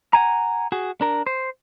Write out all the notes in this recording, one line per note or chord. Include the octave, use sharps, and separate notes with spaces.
F#5 G#5 A#5
F#4 G#4
D4 A#4
C5